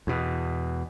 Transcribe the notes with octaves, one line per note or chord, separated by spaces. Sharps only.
E2 B2